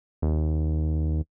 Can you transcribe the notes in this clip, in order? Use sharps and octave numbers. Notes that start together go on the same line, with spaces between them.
D#2